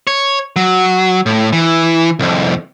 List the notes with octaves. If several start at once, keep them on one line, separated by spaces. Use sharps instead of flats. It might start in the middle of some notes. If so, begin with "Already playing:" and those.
C#5
F#3
A2
E3
C2 F2